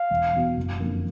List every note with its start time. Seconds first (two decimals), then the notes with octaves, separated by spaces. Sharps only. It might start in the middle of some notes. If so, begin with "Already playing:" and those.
Already playing: F5
0.10 E1
0.34 E2 B2
0.57 F#1
0.80 F2 D3 F3 A#3